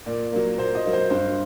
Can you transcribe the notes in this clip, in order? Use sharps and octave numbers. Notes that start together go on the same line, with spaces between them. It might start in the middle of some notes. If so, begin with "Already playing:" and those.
A#2 D5
F#3 A#3
A#2 C5
D#5
F#3 A#3
C5
G2 C5